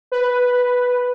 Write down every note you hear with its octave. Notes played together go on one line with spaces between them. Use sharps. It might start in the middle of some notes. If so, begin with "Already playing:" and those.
B4